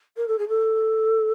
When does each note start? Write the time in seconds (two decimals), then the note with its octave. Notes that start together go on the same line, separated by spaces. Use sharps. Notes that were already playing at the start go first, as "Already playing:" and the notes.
0.16 A#4
0.27 A4
0.38 G#4
0.48 A4